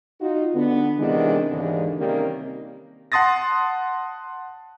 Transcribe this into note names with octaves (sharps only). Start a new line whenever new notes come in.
D#4 F4 F#4
D3 B3
C3 D#3 E3 G#3 B3 D4
D#2 G#2 D3 E3
C3 D#3 G3 A#3 C4 C#4
F#5 A5 C6 D#6 A6 A#6